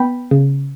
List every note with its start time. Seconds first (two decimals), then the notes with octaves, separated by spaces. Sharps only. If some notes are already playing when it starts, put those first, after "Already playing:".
Already playing: B3 G5 B5
0.31 C#3